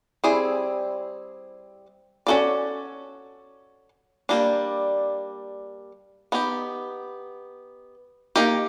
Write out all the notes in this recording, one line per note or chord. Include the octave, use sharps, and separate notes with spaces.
G3 C4 E4 G#4
C#4 F#4 A4 D5
G3 A#3 D4
B3 D#4 G4
A#3 D#4 G4 A#4